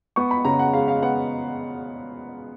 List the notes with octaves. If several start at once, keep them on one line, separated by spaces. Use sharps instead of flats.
B3 C#6
B5
C#3 A#5
F#5
G#3 F5
F5
B3 F#5